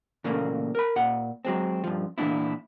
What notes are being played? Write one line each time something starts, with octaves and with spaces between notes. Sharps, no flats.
A#2 C#3 E3 A3 A#3
A#4 B5
A#2 F#5
F#3 G#3 C4
G2 F3
A#2 E3 A#3 C#4 D4 E4